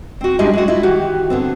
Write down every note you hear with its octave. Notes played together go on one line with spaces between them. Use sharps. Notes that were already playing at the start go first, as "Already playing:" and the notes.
C4 F#4
G#3 C#4 D4 E4 G4 D#5
G#3 A3 F#4
E4 F4 D#5
D#3 E3 F#4 G4
D3 B3 C4